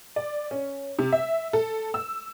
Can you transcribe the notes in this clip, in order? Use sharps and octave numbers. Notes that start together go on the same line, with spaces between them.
D5
C#4
C3
E5
A4
E6